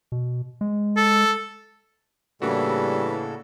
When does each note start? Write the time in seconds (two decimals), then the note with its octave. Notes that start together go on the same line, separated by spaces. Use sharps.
0.12 B2
0.61 G#3
0.96 A4
2.42 A2 C#3 E3 G3 A#3 D4 F#4 A4